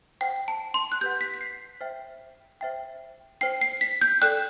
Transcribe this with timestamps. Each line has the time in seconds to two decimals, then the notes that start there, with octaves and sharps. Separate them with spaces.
0.21 C5 F#5 G5
0.48 A5
0.74 C6
0.92 F#6
1.01 G4 B4 F#5 G6
1.21 B6
1.34 B6
1.41 C7
1.81 C5 E5 G5
2.61 C5 E5 G5
3.41 C5 G5 C7
3.61 C7
3.81 B6
4.01 G6
4.22 A4 D5 G5 F#6